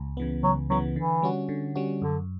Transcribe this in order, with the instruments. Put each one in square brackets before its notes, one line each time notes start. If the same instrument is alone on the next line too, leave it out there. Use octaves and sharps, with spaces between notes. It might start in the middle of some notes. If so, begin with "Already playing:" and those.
Already playing: [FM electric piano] C#2
C#3 E3 B3
[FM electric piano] C#2 [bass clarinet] F#3
[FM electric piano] C#3 E3 B3 [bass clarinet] F#3
[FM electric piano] D3 [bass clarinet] E3
[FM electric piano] G3 C#4 F#4
D3
G3 C#4 F#4
[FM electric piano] F#2 [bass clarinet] D3